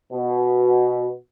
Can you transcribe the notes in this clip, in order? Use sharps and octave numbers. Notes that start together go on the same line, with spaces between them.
B2